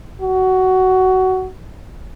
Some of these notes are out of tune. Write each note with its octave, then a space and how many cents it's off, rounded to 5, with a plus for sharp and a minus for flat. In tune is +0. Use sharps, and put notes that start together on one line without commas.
F#4 +15